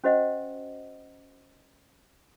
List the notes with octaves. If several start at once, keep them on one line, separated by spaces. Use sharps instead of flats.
C#4 F#4 C5 D#5 F#5